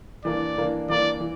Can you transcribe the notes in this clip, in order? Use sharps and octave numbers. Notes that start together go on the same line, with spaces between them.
E3 A#3 D4 D5
E3 A#3 D4
E3 A#3 D4 D5
E3